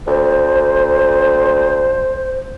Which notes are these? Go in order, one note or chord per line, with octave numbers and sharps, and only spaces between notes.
D2 C5